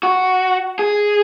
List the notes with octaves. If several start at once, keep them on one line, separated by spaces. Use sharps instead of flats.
F#4
G#4